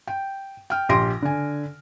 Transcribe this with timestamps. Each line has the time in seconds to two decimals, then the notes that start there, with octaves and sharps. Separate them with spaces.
0.07 G5
0.70 G5 F6
0.89 A#1 G4 C6 A#6 D7
1.22 D3 G#5